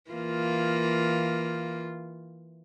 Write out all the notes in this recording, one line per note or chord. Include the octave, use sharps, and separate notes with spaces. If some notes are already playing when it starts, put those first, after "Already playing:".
E3 A#3 F4